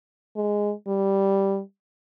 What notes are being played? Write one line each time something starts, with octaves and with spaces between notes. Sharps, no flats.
G#3
G3